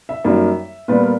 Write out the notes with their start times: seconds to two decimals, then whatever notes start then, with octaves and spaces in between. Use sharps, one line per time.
0.09 E5
0.24 F#2 D#3 G3 A#3
0.88 A#2 G3 B3 B4
1.00 A#4